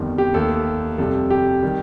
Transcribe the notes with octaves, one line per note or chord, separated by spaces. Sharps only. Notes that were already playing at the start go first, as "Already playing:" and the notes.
Already playing: G1 F2 D#3 G3
G4
D#2 D#3 A3 A4
F2 C3 G3 A4
G4
D#3 G3